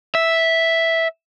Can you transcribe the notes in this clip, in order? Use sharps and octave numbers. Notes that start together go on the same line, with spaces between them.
E5